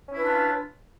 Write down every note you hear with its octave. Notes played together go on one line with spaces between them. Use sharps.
C#4 D4 E4 F4 B4